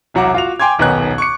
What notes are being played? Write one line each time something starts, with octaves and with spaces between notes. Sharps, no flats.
E1 C2 F#3 F#5 A#5 D6
F4 F#4 F7
G5 G#5 C6 D6 G#6
D#1 B1 D#3 B3 G#5 F#6
C#6 D6 C#7